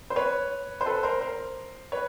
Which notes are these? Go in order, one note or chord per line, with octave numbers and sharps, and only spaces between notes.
C5
B4 C#5
C5
A4 B4
A#4 C5
A#4 C5
B4 C#5